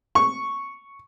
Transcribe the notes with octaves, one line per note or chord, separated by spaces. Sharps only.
C#6